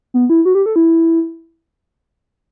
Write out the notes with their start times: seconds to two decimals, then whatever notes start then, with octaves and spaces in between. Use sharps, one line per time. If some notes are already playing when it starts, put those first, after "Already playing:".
0.14 B3
0.30 E4
0.45 F#4
0.55 G4
0.66 A4
0.76 E4